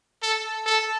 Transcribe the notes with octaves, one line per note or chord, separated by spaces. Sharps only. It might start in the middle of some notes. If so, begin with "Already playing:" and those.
A4
A4